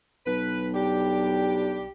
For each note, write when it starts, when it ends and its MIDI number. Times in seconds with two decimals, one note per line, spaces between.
0.26 1.87 35
0.26 0.68 71
0.74 1.89 55
0.74 1.89 62
0.74 1.89 67